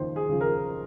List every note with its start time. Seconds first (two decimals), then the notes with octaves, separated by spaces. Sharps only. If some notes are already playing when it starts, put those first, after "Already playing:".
Already playing: D#2 C#3 F3 C5
0.16 G#4
0.29 C#3 F3
0.41 A#4